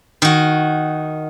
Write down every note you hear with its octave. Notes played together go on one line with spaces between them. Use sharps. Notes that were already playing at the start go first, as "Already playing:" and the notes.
D#3 F#4